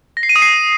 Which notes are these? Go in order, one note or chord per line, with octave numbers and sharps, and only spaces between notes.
A#6
C7
D#7
D#6
C7